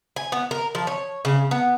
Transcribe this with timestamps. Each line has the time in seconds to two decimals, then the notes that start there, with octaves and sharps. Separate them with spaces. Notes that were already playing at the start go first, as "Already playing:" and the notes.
0.16 G#5
0.32 B3
0.51 A#4
0.75 F3
0.87 C#5
1.25 C#3
1.51 B3